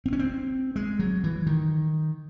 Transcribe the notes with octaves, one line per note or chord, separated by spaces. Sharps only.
C4
C#4
C4
G#3
F#3
E3
D#3